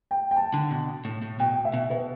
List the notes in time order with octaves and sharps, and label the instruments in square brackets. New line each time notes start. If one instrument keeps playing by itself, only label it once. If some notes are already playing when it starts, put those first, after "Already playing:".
[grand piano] G5
G5
A5
[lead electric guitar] D3
B2
A2
A2
[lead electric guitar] B2 [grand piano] G5
[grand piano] E5
[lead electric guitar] B2
[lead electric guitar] B2 [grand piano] B4